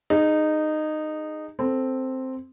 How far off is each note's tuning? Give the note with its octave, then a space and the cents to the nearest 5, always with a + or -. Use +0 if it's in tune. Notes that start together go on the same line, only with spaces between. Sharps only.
D#4 -15 G#4 +0
C4 +0 A4 +0